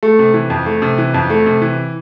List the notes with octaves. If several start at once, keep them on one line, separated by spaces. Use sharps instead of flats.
A3
C3
E3
F2
A3
C3
E3
F2
A3
C3
E3